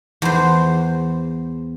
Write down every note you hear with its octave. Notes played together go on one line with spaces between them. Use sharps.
E2 C5